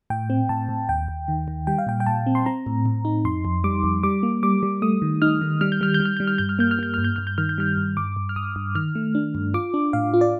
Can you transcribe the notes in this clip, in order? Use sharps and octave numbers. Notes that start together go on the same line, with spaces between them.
A2 G5
C4
A2 A5
A2
D#2 G5
D#2
D#3
D#3
G3 G5
F5
A#2 G5
G5
A#2 A5
C4
C6
C4 A#5
A2
A2
D#4
F2 C6
F2
G3 D6
F2
G3 D6
A#3
G3 D6
G3
A3 D#6
D#3
D#4 F6
D#3
G3 F6
G6
G3 F6
G6
G3
F6
G3 G6
F6
G2 G6
F6
A#3 G6
F6
A#3 G6
G2 F6
G6
G2 F6
G6
D#3 F6
G6
G3 F6
G2
G2 D6
G2
F6
G2 D#6
G2
D#3 F6
A3
D4
G2
F4 D6
D4
A2 F5
F4
D5